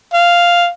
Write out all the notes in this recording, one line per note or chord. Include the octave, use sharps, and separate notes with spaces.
F5